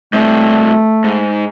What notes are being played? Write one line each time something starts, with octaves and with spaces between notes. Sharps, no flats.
G2 C3 A3
G#2